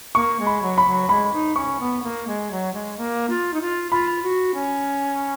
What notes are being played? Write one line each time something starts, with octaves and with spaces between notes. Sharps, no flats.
A#3 C#6
G#3
B5
F#3
B5
F#3
G#3 B5
D#4
C#4 C#6
B3
A#3
G#3
F#3
G#3
A#3
F4
D#4
F4
F4 B5
F#4
C#4